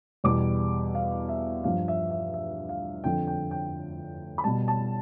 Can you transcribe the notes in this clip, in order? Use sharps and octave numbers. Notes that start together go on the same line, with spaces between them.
E2 B2 G3 D6
F5
E5
G2 F3 F5
E5
E5
E5
F5
F2 D3 F3 G5
G5
G5
B5
B2 G3 A5
A5